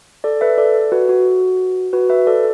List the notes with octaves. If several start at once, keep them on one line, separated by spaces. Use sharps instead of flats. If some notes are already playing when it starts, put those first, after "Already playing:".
A4 D5
B4 E5
A4 D5
F#4 B4
F#4
F#4 B4
B4 E5
A4 D5